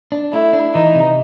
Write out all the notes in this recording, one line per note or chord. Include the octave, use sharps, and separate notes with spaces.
D4
A3 E4
D4
E3 D#4
C3